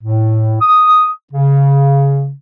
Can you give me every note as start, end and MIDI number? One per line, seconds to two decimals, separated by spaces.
0.02 0.56 45
0.61 1.09 87
1.32 2.32 49